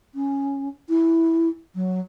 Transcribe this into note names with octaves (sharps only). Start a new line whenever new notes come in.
C#4
E4
F#3